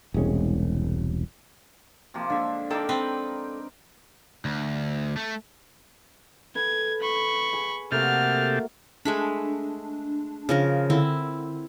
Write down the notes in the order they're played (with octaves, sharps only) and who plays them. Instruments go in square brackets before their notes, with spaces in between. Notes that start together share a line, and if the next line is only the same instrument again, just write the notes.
[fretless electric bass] E1 C2 G#3 C#4
[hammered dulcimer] C3 F3 A#3
[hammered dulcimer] D3 E5 [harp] G#3 D4 A4
[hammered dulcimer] D#4 A#4 D5 [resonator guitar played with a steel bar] A4 G5 [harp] A#5 A#6 C7
[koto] C4 B4
[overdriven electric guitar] D2
A3
[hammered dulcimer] A4 B4 [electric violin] G#6
[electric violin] B5 C#6
[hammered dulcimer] G#4
[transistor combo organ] C3 G4 A4 [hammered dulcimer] A3 A#3 F#4 [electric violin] F6
[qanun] G#3 A3 B5 [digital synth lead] D4
[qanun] C#3 F3 A#4
[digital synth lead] D3 [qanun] C4 E4